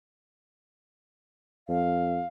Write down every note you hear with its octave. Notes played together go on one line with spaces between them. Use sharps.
F2 F5